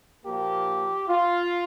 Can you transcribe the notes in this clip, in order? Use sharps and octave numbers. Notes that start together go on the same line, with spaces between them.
A#2 F3 A#3 G4
F4